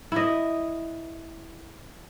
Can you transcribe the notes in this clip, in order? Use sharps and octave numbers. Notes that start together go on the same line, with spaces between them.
E4 D#5